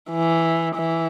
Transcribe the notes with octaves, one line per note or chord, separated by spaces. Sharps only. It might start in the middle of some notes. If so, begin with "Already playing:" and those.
E3
E3